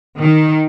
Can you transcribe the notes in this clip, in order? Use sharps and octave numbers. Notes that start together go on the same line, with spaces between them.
D#3